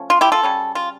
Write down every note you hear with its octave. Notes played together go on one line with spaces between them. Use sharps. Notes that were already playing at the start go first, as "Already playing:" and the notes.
Already playing: F3 A3 C#4
F4
E4 G4
F4 A4
C#3 G3 C#4
F4